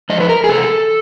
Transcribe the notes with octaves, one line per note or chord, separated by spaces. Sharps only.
F#2 C#3 F3 D#5
B4
A#4
G#4
E2 C3 A4